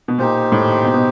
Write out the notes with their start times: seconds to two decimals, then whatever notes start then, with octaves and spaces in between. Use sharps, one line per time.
0.08 B2
0.18 A#2 D#4 G4 C5
0.52 A2
0.84 B2
0.94 B2